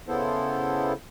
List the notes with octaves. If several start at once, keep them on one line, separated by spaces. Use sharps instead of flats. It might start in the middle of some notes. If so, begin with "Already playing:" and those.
C#3 B3 E4 A4 C5